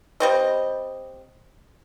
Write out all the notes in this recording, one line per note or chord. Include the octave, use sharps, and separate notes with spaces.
G3 C4 D#5